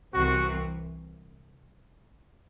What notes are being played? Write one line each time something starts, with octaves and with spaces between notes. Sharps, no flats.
C2 C3 E3 F#4